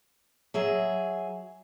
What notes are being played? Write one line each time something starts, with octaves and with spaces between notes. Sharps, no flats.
F#3 G#4 E5